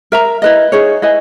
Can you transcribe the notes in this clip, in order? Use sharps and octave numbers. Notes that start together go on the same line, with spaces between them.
A#4 E5 A#5
E4 B4 D#5
D#4 G#4 C#5
E4 B4 D#5 G#5